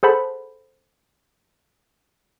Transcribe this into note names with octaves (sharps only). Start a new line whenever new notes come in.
G#4 A4 C5 F#5 A5 B5